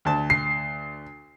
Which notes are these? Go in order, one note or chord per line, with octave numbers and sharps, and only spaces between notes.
D2 A5
C7